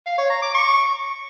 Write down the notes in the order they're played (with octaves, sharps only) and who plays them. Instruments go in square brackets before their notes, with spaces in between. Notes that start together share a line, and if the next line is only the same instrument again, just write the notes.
[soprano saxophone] F5
C#5
A#5
D6
C#6